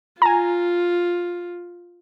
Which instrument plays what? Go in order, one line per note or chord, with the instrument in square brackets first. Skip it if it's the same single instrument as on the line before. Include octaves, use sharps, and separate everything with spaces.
[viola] F4 [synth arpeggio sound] G#5 A#5